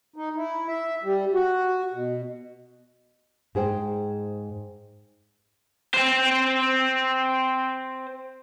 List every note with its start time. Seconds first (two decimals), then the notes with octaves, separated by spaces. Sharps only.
0.16 D#4
0.36 E4
0.68 E5
1.03 G3
1.33 F#4
1.93 B2
3.55 G#2 G#4 C5 G5
5.94 C4 C5